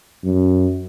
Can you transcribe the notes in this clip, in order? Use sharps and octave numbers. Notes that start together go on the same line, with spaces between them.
F#2